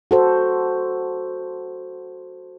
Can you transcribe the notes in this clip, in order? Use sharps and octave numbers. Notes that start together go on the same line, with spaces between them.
F#4 A4 C5